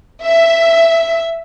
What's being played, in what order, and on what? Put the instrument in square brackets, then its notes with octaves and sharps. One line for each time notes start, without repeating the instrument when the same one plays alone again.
[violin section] E5